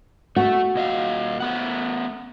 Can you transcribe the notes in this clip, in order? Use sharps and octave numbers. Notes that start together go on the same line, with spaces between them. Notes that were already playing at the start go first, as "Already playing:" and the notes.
A3 F#4
A#2 D#5 F5
A3 B3 F#5